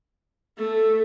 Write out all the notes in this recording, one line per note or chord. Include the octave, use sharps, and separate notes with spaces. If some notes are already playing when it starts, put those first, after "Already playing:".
A3 A4